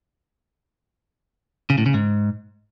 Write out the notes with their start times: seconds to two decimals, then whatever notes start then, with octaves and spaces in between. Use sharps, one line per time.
1.70 C#3
1.78 A2
1.86 C#3
1.94 G#2